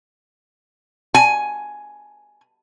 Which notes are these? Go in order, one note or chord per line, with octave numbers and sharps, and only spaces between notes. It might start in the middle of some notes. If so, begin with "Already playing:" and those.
G#5